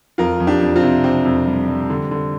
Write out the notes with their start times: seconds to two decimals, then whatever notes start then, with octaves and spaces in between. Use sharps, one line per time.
0.18 F2 F4 A#4
0.40 F2
0.47 D4 G4
0.61 F2
0.76 C4 F4
0.83 C3
1.04 C3 C4
1.25 F2
1.47 G3
1.68 G3
1.90 D3
2.11 D3